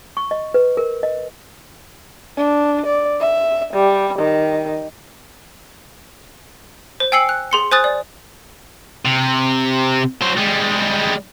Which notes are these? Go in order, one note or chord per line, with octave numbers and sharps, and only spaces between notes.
C#6
D#5
B4
A#4
D#5
D4
D5
E5
G3
D#3
C5
G5 G#5 E6 C7 C#7 F#7
F#6
G#4 C6 C#7
C5 G#5 D#6 F#6 A6
D5
C3
F#3 C5
G3 G#3